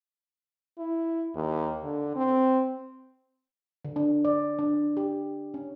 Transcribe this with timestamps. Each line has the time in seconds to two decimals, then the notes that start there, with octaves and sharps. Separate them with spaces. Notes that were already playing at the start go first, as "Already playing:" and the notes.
0.78 E4
1.35 D#2
1.84 D3
2.16 C4
3.85 D3
3.96 D4
4.25 D5
4.59 D4
4.97 G4
5.54 C#4